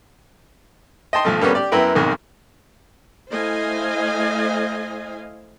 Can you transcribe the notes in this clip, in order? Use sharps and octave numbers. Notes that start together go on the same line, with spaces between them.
D#5 G5 A5 C6
B1 F3 A3
D3 G3 A#3 B3 C#4
G4 D5
F#2 B3 E4 A#4 B4 G5
B1 F2 G#2 D#3
A3 E4 C5 D#5 F5 G#5